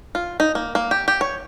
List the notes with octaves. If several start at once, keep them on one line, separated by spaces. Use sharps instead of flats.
F4
D#4
A#3
A#3
G4
G4
C#5